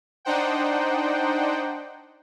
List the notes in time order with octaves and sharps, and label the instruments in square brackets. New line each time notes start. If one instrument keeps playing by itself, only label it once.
[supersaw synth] D4 D#4 C5 F#5 G5